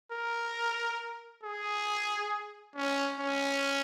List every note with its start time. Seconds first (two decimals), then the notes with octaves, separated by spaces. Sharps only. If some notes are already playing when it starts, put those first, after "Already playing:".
0.12 A#4
1.43 G#4
2.76 C#4
3.20 C#4